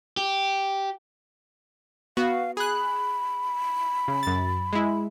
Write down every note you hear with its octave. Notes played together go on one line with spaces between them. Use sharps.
G4
B3 F#4 F5
G#4 B5 F#6
C#3
F#2 A6
G#3 E4